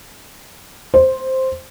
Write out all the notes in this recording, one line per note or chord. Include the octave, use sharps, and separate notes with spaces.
C5